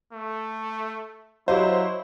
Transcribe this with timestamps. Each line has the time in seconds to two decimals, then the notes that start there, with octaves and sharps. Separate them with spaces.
0.13 A3
1.48 F#3 E4 G4 C5 D#5 F5